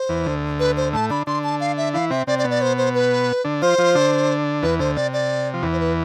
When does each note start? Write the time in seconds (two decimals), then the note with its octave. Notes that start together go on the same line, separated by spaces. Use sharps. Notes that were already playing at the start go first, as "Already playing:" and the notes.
Already playing: C5
0.09 E2 E3
0.26 D2 D3
0.60 B4
0.77 C5
0.93 A2 A3 A5
1.10 D3 D4 B5
1.27 D3 D4 C6
1.44 A5
1.60 F5
1.77 E5
1.93 E3 E4 F5
2.10 C3 C4 E5
2.27 C3 C4 D5
2.39 D5
2.44 B2 B3
2.50 D5
2.62 C5
2.78 C5
2.95 B4
3.44 D3 D4
3.62 F3 F4 C5
3.78 F3 F4
3.95 D3 D4
4.62 E2 E3 B4
4.79 D2 D3 C5
4.96 C3 D5
5.13 D5
5.54 F3
5.63 E2 E3
5.73 C5
5.80 B4